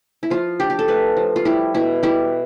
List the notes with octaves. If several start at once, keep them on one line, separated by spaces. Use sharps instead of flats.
E4
F3 F4
D4 G4
G4
A4
A3 B4
F3
F4
G3 E4
B2 E4
G3 E4